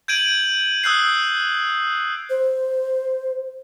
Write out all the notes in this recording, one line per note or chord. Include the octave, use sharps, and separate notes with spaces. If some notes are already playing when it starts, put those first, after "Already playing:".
G6 G#6 D7 D#7 F#7
D#6 E6 F#6 G6 C7
C5